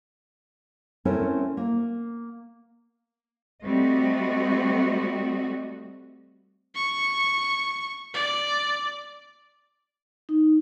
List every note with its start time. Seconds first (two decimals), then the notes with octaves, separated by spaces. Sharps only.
1.05 A3 C4 C#4 E4 A4 A#4
1.57 A#3
3.64 G3 A3 C4 F#4 D#5
6.75 C#6
8.14 D5
10.29 D#4